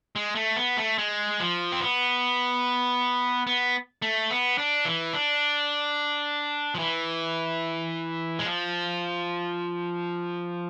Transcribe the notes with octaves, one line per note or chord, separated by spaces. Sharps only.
G#3
A3
B3
A3
G#3
F3
C4
B3
B3
A3
B3
D4
E3
D4
F3
E3
G#3
F3